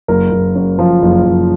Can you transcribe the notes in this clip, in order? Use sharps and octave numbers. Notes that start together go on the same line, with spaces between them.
F#1 A#4
F#1
F#2
F3
F#1
F#1